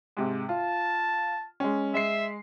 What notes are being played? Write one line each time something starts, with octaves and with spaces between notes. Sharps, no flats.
G#2 C3
F4 A5
G#3 C#4
G#3 E5 C7